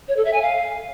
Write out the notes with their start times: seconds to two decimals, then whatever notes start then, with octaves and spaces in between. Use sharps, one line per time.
0.08 C#5
0.16 A4
0.25 E5
0.33 G#5
0.41 F5